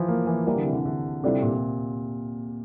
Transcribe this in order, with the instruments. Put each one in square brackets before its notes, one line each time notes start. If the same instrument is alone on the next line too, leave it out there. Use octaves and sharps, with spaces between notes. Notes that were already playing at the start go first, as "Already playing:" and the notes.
Already playing: [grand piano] E3 F3
A#3
E3
[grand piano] E3 [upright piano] G3 A#3 E4
[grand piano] D3
C3
D3
D3
[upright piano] A2 G3 D4 F4 A4 [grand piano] C3
[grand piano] A#2